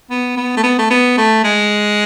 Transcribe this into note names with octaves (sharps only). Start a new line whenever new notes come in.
B3
B3
A3
B3
A3
B3
A3
G#3